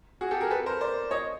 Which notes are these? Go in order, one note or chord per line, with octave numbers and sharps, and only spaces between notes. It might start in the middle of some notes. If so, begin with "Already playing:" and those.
F#4 G#4
G4 A4
G#4 A#4
A4 B4
A#4 C5
C5 D5
C#5 D#5